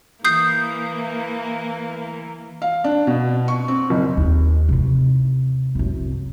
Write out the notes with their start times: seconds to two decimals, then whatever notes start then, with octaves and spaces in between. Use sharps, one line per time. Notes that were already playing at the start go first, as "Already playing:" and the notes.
0.24 E3 A#3 D#6 G6 C7
2.62 F5
2.84 D4
3.07 B2
3.48 C#6
3.68 C4
3.90 F#1
4.17 D#2
4.69 C3 E3
5.75 C2 F#2